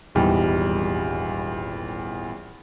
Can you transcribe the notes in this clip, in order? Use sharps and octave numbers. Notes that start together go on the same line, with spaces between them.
D#1 G#1 E2 D#3 G3 G5